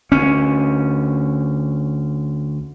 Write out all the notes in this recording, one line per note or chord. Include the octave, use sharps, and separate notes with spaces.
D2 C#4